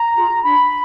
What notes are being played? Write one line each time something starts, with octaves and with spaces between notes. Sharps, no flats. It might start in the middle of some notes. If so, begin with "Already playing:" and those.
Already playing: A#5
F4 G#4
D4 B5